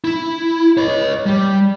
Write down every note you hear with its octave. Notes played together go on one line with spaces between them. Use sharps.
E4
C#5 D#5
G3